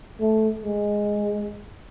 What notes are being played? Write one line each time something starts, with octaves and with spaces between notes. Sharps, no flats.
A3
G#3